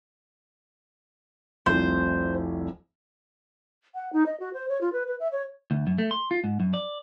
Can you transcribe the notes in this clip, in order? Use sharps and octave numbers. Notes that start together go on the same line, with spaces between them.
F1 C2 C5
F#5
D#4
D#5
F#4
C5
C#5
F4
B4
B4
E5
C#5
D2
F#2
A3
C6
F4
G#2
F#2
D5